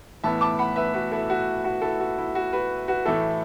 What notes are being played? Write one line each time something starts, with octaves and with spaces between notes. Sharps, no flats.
A2 E3 B3 E5 A5
A5 D6
F#5 B5
B4 E5
F#4 B4
E4 A4
F#4
F#4
E4 A4
F#4
E4
F#4
F#4 B4
F#4 B4
A2 E3 A3 E4 A4